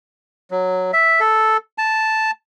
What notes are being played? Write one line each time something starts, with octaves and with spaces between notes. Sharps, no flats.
F#3
E5
A4
A5